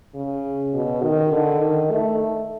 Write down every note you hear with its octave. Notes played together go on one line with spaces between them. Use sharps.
C#3
B2
D#3
D3
D#3
A3